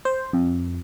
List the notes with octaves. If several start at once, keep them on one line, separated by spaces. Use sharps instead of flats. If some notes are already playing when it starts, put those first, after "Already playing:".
C5
F2